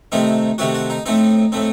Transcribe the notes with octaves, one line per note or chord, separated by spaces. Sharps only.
C3 D#3 A3 C4 D#4
C3 D#3 A3 C4 F#4
F#4
D#4
A2 A3 C4 D#4
A2 A3 C4